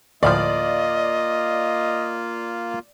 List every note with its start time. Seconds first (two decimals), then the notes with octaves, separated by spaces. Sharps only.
0.23 D2 A2 F3 A#3 F4 D5 D#5